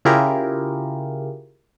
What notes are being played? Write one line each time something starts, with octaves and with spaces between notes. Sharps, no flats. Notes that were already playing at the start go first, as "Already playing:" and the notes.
C#3 E4 F4 G4 G#4 A#4